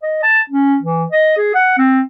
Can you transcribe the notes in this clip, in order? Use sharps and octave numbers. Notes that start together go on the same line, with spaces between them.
D#5
A5
C#4
E3
D#5
G#4
F#5
C4